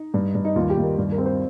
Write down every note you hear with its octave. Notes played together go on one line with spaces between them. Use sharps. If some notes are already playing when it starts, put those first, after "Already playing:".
Already playing: D#4
G2
G2
D#4
D#2 F4
G4
D#2
A#4
G2
A#4
C4
C5